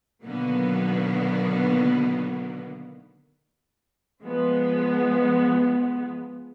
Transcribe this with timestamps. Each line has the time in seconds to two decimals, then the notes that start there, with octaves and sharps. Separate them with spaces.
0.23 B2 D3 D#3 F#3 A#3 B3
4.22 F3 G#3 B3